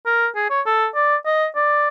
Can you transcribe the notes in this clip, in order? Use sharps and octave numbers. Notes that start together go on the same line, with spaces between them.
A#4
G#4
C#5
A4
D5
D#5
D5